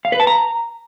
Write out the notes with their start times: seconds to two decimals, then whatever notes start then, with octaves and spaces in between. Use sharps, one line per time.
0.05 F5
0.12 B4
0.20 A5
0.27 A#5